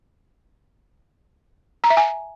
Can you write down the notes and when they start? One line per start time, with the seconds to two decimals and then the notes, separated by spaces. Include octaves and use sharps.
1.84 A#5
1.90 E5
1.97 G#5